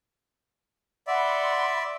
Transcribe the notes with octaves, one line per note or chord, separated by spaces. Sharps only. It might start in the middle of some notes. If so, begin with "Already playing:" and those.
D5 E5 F#5 B5 C6